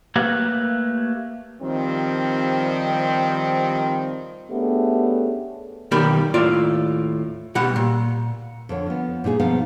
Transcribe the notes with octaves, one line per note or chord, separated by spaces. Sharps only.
A3 A#3 G4 B4 C#5 F#5
D#3 F3 G3 C4
A3 B3 C#4 D4 G4 G#4
B1 D#3 G3 A#3 G4 B5
D#2 A2 F4 D5
B2 G3 F#5 B5
A#2
F2 D3 C#5
F3 B3
A#2 D#4 F4 G#4
B2 F3 B3 D#4 F5